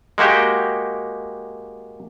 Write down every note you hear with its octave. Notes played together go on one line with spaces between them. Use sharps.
G#3 A#3 F#4 G4 G5